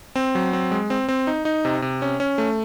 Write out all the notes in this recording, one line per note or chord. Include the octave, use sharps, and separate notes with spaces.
C4
F#3
C4
G#3
C4
C4
D#4
D#4
C3
C3
C#4
C#4
A3